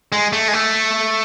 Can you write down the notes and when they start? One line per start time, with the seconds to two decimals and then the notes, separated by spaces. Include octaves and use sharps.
0.12 G#3
0.33 A3
0.48 G#3
0.53 A3